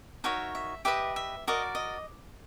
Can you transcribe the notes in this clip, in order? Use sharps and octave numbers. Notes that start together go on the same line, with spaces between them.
D#4 F#4 A#4 C#5 E5
E5
G4 B4 D#5 E5
E5
F#4 A#4 D5 D#5
D#5